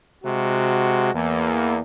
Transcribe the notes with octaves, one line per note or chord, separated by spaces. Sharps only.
C3 G#3 F#4
E2 A#3